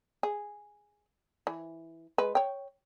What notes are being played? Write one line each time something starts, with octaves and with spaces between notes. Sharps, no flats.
G#4
E3
G#3 B4
C#5 G5